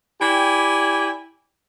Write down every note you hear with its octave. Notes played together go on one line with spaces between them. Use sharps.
E4 G4 D5 G5 G#5